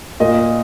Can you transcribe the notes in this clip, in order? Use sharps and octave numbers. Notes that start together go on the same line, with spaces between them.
A#2 D#5